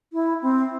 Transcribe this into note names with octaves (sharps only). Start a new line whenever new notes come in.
E4
C4